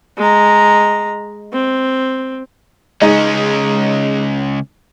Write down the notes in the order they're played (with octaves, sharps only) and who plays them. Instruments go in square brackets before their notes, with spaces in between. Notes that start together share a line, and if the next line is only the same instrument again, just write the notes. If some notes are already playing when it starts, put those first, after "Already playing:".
[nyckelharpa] G#3 A#5
C4
[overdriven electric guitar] C#2 C#4 [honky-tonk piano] G#3 D#4